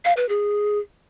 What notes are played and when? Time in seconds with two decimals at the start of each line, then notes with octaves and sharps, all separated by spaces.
0.05 F5
0.17 B4
0.29 G#4